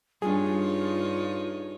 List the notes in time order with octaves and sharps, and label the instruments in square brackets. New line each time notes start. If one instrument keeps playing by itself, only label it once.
[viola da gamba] G2 D#4 C#5 [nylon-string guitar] G3 D4 [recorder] F4 [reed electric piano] G#4